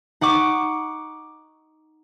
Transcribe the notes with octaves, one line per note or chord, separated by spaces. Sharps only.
D#4 F#5 C#6 D6